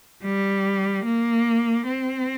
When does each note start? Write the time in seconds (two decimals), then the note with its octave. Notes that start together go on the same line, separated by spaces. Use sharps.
0.24 G3
1.05 A#3
1.87 C4